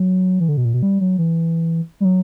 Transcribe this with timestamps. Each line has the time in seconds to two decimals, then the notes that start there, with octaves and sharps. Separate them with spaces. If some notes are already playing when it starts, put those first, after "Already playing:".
Already playing: F#3
0.40 E3
0.48 D3
0.57 B2
0.65 A#2
0.74 B2
0.82 G3
1.01 F#3
1.18 E3
2.00 G3
2.05 F#3